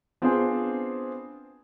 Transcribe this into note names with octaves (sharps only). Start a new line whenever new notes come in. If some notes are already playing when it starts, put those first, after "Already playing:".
B3 C4 D4 F4 G#4 C5